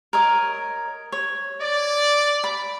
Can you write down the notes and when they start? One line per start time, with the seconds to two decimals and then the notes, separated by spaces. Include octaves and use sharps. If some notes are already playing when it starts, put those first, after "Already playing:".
0.13 A#4 C#5 D#5
1.12 C#5
1.61 D5
2.44 B5